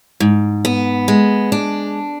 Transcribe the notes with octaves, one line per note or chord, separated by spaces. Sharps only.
G#2
B3
G#3
D4